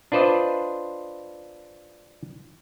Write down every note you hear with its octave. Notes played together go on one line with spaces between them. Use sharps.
D4 F4 B4 C5 D5 D#5